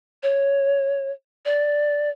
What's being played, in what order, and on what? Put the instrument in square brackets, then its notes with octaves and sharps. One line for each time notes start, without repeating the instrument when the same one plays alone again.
[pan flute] C#5
D5